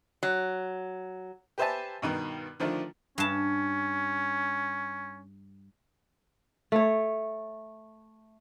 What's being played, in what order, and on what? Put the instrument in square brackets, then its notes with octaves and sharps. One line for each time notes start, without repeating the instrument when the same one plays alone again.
[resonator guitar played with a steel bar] F#3
[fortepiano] G4 B4 C5 E5 G#5 A5
G2 B2 D#3
D3 D#3 F3 A3 D4
[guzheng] G2 A5 [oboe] C#4
[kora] A3 C#5